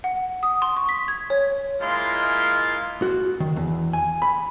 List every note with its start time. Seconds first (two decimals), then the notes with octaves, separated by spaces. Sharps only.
0.04 F#5
0.43 D#6
0.62 C6
0.76 C#6
0.89 B6
1.08 G#6
1.30 C#5
1.81 G#3 A#3 E4 F4 C6
3.02 F#4
3.40 D#3
3.56 E2
3.93 G#5
4.22 B5